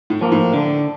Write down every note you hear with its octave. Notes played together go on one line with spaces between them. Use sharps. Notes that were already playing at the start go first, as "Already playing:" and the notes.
A2
F3 A#3
A2
D3